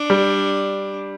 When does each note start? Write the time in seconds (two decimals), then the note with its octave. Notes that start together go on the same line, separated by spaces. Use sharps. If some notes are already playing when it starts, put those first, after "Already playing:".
Already playing: D4
0.10 G3